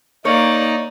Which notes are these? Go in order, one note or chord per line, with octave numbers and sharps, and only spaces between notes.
A#3 D#4 A#4 C#5 D5